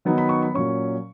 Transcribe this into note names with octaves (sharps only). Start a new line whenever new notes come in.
D#3 F#3 B3 D#4
B5
C#6
B5
A#2 F#3 C#4 C#6